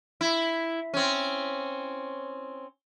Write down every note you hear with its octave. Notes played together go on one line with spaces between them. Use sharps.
E4
C4 C#4